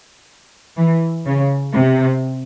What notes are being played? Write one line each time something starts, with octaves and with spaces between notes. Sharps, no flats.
E3
C#3
C3